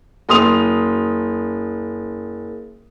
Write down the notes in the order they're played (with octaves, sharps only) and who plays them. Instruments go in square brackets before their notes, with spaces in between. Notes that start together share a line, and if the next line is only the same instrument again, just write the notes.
[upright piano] F#1 C6 D#6 F7